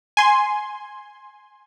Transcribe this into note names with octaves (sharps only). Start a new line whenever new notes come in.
G#5 C6